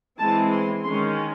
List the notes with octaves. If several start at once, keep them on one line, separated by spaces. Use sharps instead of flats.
E3 G#3 C4 A5
C6
D#3 G#3 C#4 C6